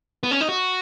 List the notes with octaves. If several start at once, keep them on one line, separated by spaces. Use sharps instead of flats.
B3
C#4
D#4
F#4